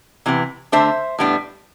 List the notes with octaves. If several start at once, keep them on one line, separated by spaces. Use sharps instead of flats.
C3 E3 B3
D3 A3 D4 C5 E5
A2 G3 B3 D4